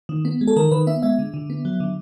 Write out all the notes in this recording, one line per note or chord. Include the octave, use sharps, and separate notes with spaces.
D#3
B3
G#3
A4
D#3 A#4
D#3 B4
B3 E5
G#3 E5
D3
D3
B3
F#3
D3